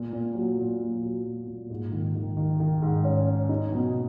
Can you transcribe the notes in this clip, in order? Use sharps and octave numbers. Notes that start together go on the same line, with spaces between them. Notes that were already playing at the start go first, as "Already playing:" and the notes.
Already playing: A#2
A#2
F#3
A#2
F#3
F#3
A#2
A#2
G#2
D#3
D#3
D#3
D#3
G#2
C#4
C#4
D#4
B2